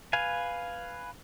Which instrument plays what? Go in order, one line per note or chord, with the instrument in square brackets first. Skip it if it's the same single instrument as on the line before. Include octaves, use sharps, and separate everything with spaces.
[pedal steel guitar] B4 F5 G#5